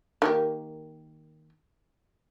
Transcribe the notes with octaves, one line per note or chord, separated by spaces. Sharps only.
D#3 A#3 G4